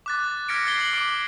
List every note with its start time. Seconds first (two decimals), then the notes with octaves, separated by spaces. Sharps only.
0.06 D6 F#6 A6
0.31 A6
0.49 F6 G#6 A#6 B6 C#7 D7
0.65 G#6 A6 C7 G7
0.81 F#7
0.93 D6 D7 G7